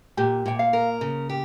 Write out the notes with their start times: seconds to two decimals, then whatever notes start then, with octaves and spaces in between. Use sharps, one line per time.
0.17 A#2 G4
0.46 A#2 G5
0.59 F5
0.73 A#4
1.01 C#3
1.29 G4